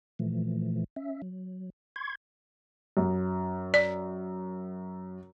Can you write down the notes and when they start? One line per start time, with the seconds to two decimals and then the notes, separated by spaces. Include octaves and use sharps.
0.19 A#2 E3 F3 A3
0.96 C#4 E5
1.22 F#3
1.96 C6 C#6 G#6
2.97 F#2
3.74 D5